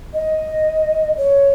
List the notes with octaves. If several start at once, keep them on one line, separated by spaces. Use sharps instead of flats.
D#5
C#5